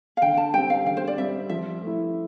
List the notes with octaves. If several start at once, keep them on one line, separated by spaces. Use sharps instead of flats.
F5
D3 G5
A5
G3 C4 G5
F5
D3 F5
C5
D5
G3 C4 E5
F3 E5
A3
E4